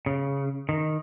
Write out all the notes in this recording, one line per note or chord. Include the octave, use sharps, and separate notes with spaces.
C#3
D#3